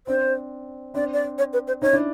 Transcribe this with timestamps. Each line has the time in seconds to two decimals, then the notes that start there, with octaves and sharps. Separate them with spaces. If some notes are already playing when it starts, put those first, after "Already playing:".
0.07 C4 D4 C5
0.94 C4 D4 D5
1.13 D5
1.38 C#5
1.53 B4
1.67 C5
1.82 C#4 D#4 C#5
1.92 D4 E4